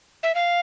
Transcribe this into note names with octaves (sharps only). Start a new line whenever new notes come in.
E5
F5